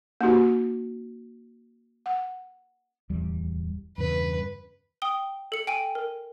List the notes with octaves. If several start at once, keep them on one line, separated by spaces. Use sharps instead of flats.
A#3 C#4 D#4 F#4 G4
F#5
D1 E2 G3
E2 G2 C#3 B4
G5 D#6 G7
A4 C#7 F#7
G5 G#5 D7 D#7
A#4